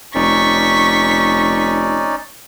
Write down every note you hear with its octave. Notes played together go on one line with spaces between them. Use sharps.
F1 C#4 D#4 D5 C#6 B6